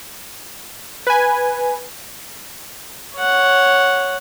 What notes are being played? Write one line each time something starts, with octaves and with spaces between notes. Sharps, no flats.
B4 G#5
C#5 F#5